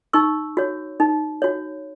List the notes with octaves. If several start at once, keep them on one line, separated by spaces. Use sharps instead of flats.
D#4 C#6 E6
F#4 C#5
D#4
F#4 C#5